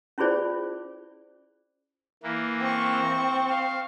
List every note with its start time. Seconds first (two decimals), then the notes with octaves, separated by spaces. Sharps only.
0.18 C#4 E4 F4 G#4 C5 D5
2.23 E3 A#3
2.60 C4 C#6
3.50 F5